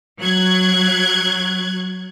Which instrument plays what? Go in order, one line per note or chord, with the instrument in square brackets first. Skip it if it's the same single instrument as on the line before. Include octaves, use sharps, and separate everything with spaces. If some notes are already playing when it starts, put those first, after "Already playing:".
[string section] F#3 F#6 G#6